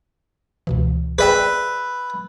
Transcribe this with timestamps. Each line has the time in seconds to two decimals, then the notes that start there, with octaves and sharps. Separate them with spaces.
0.67 C#2 B2 E3
1.19 G#4 B4 D5 E5 G5